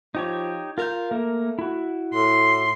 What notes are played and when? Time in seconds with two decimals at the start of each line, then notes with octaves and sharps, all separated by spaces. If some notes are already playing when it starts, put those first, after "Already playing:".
0.15 F3 D#4 G4 C#5
0.78 F4 A#4 F5 G6
1.11 A3 A#3 A#4
1.59 E4 F#4
2.14 A2 C6